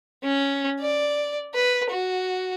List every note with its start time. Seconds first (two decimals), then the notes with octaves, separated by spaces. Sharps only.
0.23 C#4
0.80 D5
1.54 B4
1.90 F#4